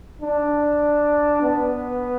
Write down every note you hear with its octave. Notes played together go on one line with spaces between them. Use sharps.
D4
B3